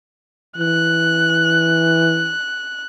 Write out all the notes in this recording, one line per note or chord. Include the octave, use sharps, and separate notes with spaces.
E3 F#6